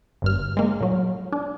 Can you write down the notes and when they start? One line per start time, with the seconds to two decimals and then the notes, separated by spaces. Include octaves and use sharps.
0.22 G1 G2 F6
0.57 G#3 A#3
0.81 A#2 F#3
1.33 D4